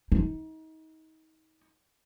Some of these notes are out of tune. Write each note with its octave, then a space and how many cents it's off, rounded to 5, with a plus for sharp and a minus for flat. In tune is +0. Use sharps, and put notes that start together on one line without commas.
D#4 +30